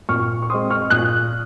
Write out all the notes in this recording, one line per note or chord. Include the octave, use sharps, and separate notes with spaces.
A#2 C#6 F6
C#6
G#3 C4 C6 D#6
C#6 F6
A#2 D#6 F#6